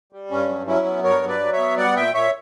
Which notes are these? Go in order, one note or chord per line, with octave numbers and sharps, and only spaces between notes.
G3
G2 C#4
F#3
F#3 C#4 E4
B3
G2 A#4 C#5
F#3
B4 D5
F#3
C#5 E5
B3
G3 D5 F#5
A#2 E5 G5
A#2 C#5 E5